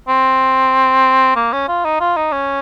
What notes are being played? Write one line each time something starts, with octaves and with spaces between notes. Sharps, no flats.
C4
A#3
C#4
F4
D#4
F4
D#4
C#4